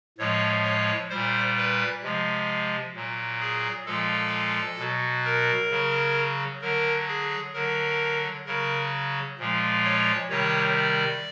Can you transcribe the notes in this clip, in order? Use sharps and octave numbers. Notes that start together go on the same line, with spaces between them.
A2 F3 G#3 C#5
C#5
A#2 G3 C5
B4
C3 F3 G#3
A#2 F#3
G#4
A#2 F3 G#3 A4
B2 F#3
A#4
C#3 F#3
D3 F#3 A#4
G#4
D3 F#3 A#4
C#3 F#3 A#4
A#2 F3 G#3
C#5
C3 D#3 G3 C#5
D5